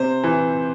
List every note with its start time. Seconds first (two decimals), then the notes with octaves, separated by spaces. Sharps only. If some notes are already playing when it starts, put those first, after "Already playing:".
Already playing: C3 C5
0.24 E3